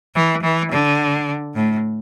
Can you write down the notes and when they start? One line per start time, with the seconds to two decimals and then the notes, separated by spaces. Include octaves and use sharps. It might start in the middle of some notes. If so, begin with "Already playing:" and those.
0.15 E3
0.43 E3
0.72 D3
1.55 A2